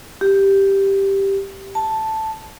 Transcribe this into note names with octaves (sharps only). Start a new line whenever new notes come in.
G4
A5